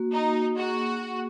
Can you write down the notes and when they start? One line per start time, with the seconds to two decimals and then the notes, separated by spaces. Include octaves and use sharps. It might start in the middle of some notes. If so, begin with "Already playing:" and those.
Already playing: A#3 F#4
0.12 A#3 D#4
0.34 A#3
0.56 F#4 G#4
0.78 G#4
0.99 G#4